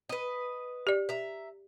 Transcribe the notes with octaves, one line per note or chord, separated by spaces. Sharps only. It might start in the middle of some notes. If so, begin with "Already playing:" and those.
B4 D#5
G4 D5
E5 A#5